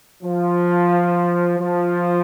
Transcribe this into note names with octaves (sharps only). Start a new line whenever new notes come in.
F3
F3